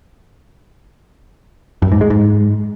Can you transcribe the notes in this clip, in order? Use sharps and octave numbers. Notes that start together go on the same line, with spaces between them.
F#2
G#2
G#3
G#2